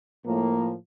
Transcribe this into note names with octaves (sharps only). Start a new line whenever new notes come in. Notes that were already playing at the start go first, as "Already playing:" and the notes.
A2 F3 A#3